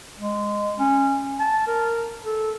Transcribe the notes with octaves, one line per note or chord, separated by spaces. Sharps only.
G#3
C#4
A5
A#4
A4